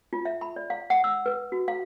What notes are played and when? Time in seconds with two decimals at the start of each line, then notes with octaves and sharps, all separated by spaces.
0.13 F4
0.25 E5
0.41 B5
0.56 D5
0.70 F5
0.90 F#5
1.04 E6
1.26 B4
1.52 F#4
1.68 F5